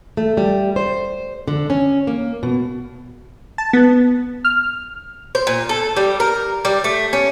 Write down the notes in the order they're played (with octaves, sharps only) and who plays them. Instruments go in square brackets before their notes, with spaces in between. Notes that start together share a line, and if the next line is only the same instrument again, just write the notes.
[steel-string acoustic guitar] A3
G3
C5
D3
C#4
A#3
B2
[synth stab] A5
B3
F6
[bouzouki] C5
A#2
A4
G3
A#4
G3
A3
C#4